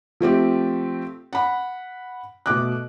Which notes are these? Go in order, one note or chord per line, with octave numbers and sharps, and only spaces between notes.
F3 A3 C4 G4
F#5 B5
B2 A3 D6 F#6